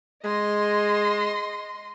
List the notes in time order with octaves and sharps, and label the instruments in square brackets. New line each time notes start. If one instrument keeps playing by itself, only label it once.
[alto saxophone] G#3 [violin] D#5 C6